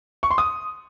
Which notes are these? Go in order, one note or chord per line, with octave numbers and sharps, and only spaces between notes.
C#6
C6
D#6